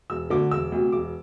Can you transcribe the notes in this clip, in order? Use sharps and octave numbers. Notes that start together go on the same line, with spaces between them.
E1 E6
D2 D3 D6
E1 E6
D2 C3
E1 D6